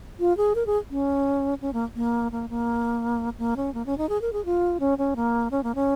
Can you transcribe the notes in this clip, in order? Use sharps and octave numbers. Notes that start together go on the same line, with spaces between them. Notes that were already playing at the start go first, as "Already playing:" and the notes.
F4
G#4
A#4
G#4
C#4
C#4
A#3
A#3
A#3
A#3
A#3
C#4
A#3
C#4
D#4
G#4
A#4
G#4
F4
C#4
C#4
A#3
C#4
A#3
C#4